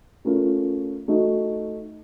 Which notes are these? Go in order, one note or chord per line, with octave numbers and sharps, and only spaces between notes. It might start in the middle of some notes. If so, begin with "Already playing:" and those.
A3 C#4 F4 A#4
A3 D#4 F#4